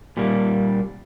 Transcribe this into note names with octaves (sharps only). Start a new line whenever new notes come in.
A#2 G3 A#3